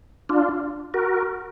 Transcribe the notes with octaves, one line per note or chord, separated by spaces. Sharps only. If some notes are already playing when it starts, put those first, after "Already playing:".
D4 F4
F#4 A#4